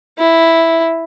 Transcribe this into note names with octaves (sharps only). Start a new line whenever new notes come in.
E4